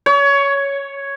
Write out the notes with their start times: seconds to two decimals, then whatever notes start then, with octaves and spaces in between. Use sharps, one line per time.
0.06 C#5